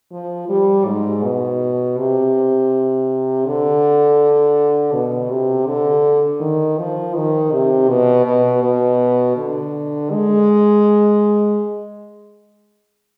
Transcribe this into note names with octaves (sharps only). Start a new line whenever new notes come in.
F3
G3
G#2
B2
C3
D3
B2
C3
D3
D#3
F3
D#3
C3
B2
B2
B2
D3
G#3